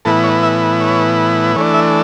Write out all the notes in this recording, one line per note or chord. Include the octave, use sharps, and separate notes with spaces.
A2 E3 B3 E4 A4
C#5
E5
C#5
E3 A3 D4 C#5
E5